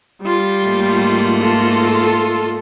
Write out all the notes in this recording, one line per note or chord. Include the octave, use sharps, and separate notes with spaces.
G3 F4
G#2 A3 A#3
F4 A4